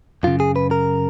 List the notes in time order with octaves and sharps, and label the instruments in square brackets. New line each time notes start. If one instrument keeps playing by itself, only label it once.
[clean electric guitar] F#2 C#3 F4
G#4
B4
A#4